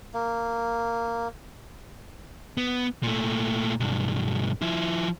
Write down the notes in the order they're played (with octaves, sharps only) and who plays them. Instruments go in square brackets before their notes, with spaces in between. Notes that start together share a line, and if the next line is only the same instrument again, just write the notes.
[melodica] A#3
[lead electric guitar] B3
A#2 A3
B1 G2
F3 E4